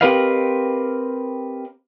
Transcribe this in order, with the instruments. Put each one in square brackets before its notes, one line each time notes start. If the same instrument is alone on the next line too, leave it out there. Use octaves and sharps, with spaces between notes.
[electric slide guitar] C4 G4 A#4 B4 D#5 F5